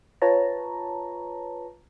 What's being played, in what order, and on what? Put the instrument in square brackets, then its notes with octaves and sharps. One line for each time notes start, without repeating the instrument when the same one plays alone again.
[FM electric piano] F4 B4 C#5 A5 A#5